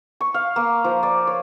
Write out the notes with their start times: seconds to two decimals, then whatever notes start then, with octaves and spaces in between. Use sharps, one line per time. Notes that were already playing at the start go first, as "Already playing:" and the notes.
0.21 C#6
0.34 F5
0.56 A#3
0.84 F3
1.03 D5
1.27 C#5